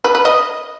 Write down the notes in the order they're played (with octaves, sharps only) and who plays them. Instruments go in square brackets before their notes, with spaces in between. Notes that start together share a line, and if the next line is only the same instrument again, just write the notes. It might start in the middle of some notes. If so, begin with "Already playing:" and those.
[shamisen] B4
B4
D#5